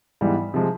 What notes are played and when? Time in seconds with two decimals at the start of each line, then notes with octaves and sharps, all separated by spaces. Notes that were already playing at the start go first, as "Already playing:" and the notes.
0.21 G#2 E3 G3 B3
0.54 C3 F3 G#3